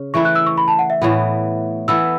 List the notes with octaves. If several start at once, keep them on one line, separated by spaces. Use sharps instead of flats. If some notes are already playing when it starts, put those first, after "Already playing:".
Already playing: C#3
E3 A3 E4 C#6
F#6
E6
C#6
B5
A5
F#5
E5
A2 E3 B3
E3 B3 A4 E6